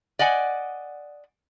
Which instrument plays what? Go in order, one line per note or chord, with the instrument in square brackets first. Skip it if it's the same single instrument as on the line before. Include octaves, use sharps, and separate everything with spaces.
[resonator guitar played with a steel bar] D5 D#5 F#5 G#5